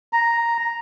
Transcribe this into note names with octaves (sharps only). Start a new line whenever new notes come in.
A#5